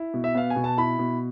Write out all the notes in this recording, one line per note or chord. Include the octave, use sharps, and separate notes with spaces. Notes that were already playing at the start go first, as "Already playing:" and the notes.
Already playing: E4
B2
E5
B3 F5
G#5
B2
A5
E4 B5
B2